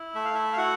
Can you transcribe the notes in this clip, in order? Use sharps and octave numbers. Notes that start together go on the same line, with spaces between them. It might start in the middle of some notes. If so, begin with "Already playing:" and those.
Already playing: E4
A3 E5
F5
E4 E5
F5
E4 F#4 F#5